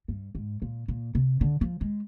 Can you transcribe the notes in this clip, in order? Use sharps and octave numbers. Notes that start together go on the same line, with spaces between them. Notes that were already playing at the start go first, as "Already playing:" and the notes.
G2
G#2
A#2
A#2
C3
D3
F3
G#3